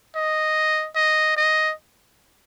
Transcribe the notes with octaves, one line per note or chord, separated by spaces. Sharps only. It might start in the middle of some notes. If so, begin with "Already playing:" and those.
D#5
D#5
D#5